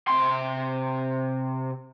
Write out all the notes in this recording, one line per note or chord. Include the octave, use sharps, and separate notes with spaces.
C3 C6